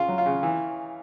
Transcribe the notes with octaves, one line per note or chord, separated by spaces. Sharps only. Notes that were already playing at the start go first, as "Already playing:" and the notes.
Already playing: C#3 F4
F#3
F4
C#3
E3